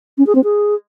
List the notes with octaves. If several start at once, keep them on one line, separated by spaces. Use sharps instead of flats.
C#4
G#4
C4
G#4